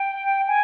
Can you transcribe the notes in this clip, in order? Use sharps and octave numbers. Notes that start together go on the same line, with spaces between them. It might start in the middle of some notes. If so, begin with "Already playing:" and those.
Already playing: G5
G#5